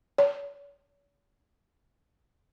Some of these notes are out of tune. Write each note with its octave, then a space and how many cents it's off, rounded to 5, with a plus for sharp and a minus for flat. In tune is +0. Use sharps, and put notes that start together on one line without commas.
C#5 +45